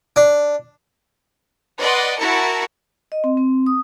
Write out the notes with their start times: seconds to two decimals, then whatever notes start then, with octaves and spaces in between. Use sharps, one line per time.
0.16 D4
1.79 B4 D5 D#5 F#5 C6
2.18 E4 F#4 A#4 A5 C#7
3.12 D#5
3.24 C4
3.37 C4
3.66 D#6